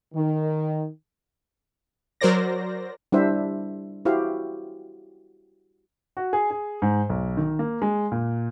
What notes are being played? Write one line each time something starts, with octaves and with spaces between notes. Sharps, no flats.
D#3
F#3 A#4 C5 D5 A#6
G3 D4 E4 C5 E5
E4 F#4 G4 C5 F5
F#4
G#4
G#4
G#2
B1
D#3
A#3
G#3
A#2